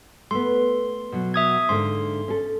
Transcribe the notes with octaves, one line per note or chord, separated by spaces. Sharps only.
A3 B3 C6
B2 F#3
E5 D#6 G#6
G#2 D3 A#3 C6
C#4 A4